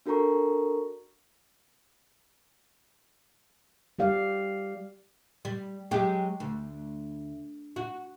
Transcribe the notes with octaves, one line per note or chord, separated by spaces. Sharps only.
D4 F#4 A4 A#4 A#5 C#6
G3 G4 D5 F5
G3
F#3 G#3 G4
D2
F#4